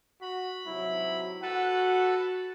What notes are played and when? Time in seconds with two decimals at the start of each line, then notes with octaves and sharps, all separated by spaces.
0.21 F#4 B5
0.66 G#2 C3 F#3 E4
1.42 F#4 A4 B4 F#5